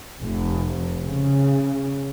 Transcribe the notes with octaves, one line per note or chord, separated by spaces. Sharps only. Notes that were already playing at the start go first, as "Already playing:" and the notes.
F1
C#3